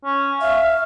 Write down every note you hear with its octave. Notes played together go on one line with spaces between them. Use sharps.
C#4
E5 F5